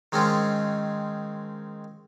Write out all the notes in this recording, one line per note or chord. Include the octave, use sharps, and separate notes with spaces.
D#3 G#3 C4 C#4 F4